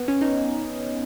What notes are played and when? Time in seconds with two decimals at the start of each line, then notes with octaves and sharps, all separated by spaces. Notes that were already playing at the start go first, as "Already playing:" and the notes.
Already playing: B3
0.08 C#4
0.21 D#4